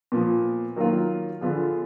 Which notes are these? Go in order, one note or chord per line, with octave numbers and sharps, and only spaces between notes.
A#2 F3 B3
D#3 F#3 A#3 F4
D3 F3 B3 F4 G#4